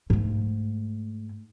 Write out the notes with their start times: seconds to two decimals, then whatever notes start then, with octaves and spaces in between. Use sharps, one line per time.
0.10 G#2 A3